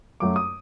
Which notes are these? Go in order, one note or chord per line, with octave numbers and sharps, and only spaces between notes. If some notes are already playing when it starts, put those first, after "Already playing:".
F#2 F#3 A3 D6
D#6